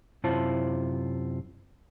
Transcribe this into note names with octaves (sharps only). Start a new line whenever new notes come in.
F#2 C3 E4 F4 C5 A5